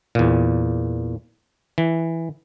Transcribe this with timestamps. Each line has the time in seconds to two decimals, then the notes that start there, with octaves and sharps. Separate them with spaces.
0.15 E2 A#2
1.78 E3